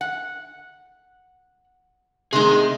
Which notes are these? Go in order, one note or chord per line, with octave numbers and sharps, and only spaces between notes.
F#5
C3 D#3 D#4 G#4 C6